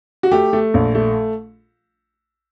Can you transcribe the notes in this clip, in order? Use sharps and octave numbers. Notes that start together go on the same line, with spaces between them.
F#4
A3 G4
A3
A#1
A3